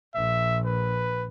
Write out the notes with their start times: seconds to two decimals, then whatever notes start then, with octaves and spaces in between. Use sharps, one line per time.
0.15 A#1 E5
0.66 B4